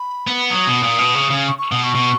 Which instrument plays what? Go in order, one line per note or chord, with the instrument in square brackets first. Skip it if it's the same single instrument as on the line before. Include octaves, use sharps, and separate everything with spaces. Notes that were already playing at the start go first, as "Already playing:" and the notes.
Already playing: [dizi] B5
[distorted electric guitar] B3
[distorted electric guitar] F#3 [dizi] D#6
[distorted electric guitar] B2
A#2
B2
C#3
C#3
[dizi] C#6
C#6
[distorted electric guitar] B2 [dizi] D#6
[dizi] C#6
[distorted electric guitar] B2